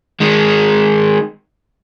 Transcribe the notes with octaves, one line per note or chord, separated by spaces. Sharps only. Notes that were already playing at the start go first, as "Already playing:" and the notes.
D#3 G#3